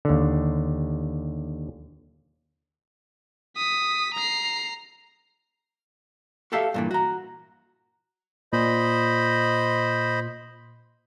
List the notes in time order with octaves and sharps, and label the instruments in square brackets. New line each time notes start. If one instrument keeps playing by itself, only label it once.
[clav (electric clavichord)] D#2 D3
[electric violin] D#6 B6
A#5 C7
[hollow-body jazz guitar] F#4 G4 A4 E5 F5
G2 A#2 E3
F#4 A#5
[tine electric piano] A#2 [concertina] C5 D#5 B5